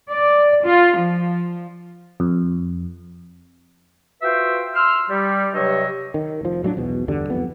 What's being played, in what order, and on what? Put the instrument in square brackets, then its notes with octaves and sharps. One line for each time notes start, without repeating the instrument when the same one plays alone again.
[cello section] D5
F4
F3
[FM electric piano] F2
[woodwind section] F4 F#4 B4 C5 E5 G5
C6 E6 F6
G3
G2 C3 F#3 C#5 D#5 E6
[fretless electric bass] D#3
F1 F3
A2 F#3 G#3 D4
B1 E2 B2
E2 G2 D3 G3
E1 B1 F2 B3